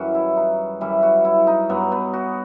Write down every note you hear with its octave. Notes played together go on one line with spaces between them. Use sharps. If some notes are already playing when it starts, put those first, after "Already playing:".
Already playing: F#2 E3 G3 F#4
E4
D#4
F#2 E3 G3 E4
F#4
E4
D#4
G2 F#3 B3
B3
F#4